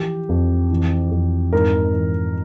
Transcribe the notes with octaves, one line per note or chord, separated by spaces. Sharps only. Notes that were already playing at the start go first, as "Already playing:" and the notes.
Already playing: E3 F3 G4
F2
E3
F2
G#2 A#4
E3